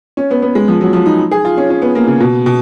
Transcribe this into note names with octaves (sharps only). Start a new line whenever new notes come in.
C#4
B3
B3
G#3
F3
F#3
F3
D#4
G#4
F4
C#4
C#4
B3
A#3
C#3
B2
B2